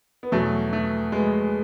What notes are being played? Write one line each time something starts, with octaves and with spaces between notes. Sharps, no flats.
B3
E2 B2 F#3 A3
A3
G#3 B3